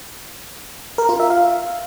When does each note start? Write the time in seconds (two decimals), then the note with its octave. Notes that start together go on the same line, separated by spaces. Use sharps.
0.98 A#4
1.09 F4
1.20 E5
1.30 F5